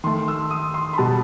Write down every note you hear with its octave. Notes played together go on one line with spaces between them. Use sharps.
D#3 A3 C6
E6
D#6
C6
B5
B2 G3 A5